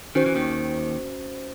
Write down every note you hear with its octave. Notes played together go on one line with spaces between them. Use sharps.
D#3 C#4 F#4 C5
E3
D#2 D#3